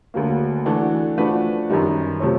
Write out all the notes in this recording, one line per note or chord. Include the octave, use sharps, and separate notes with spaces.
D2 D3 F#3 A#3
E3 A3 D4 F#4 A4
F3 A3 D4 F#4 B4
F#2 D#3 G3
C3 F3 A3 C#4